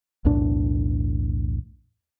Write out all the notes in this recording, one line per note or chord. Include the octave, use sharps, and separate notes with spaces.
B1 E2 A2 D4